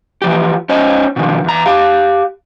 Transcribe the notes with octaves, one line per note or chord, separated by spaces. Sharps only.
E3 F3 G4
C#4 C5 C#5 D#5
B2 D3 D#3 F3
E2 A#5
G4 F5